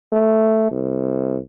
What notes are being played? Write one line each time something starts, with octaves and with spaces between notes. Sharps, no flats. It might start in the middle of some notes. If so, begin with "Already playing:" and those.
A3
C2